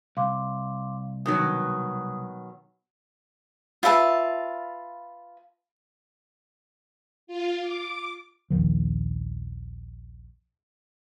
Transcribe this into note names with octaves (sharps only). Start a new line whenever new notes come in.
C2 F5 C6 D6
B2 D#3 F#3 D#6
F4 B4 E5 A5
F4
D6
A#1 D#2 D#3 F3